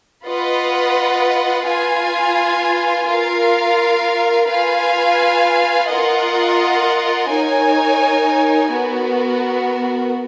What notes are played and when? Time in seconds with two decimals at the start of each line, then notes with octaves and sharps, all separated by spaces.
0.25 F4 B4 D#5 F#5
1.66 F4 B4 F5 G#5
3.07 F4 A#4 F5
4.48 F4 B4 F5 G#5
5.89 F4 A#4 D#5 F#5
7.29 D#4 A#4 C#5 G#5
8.71 B3 F#4 A#4